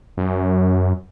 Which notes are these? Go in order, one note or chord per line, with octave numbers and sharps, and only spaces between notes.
F#2